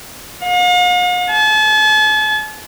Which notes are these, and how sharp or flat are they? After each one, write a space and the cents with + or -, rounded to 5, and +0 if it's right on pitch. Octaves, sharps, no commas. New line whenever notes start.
F5 +45
A5 -40